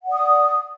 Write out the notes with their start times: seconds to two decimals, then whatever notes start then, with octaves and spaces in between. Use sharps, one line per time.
0.03 F#5
0.07 D5
0.12 D#6